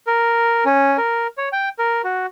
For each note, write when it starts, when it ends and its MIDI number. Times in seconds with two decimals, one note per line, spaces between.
0.07 0.64 70
0.65 0.97 61
0.98 1.27 70
1.38 1.49 73
1.52 1.69 79
1.79 2.02 70
2.04 2.26 66